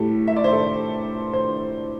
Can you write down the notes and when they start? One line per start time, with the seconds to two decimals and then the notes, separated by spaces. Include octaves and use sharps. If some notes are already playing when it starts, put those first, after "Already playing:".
Already playing: A2 A3 G4
0.28 E5
0.36 D5
0.44 C5
0.53 A4
1.33 C5